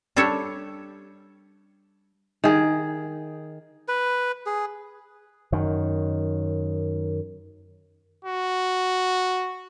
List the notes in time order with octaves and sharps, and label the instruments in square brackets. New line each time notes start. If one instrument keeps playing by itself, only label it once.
[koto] G3 D4 G4 A4 C#5
[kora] D#3 G#4
[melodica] B4
G#4
[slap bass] F#2 D#3
[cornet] F#4